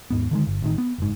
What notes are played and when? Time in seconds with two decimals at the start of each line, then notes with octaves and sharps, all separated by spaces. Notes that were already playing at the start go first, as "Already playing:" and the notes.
0.10 D#2 G#2 B3
0.31 D3 D#3 G#3
0.47 G1
0.62 A1 A2 D#3
0.78 B3
0.98 F#1 G#2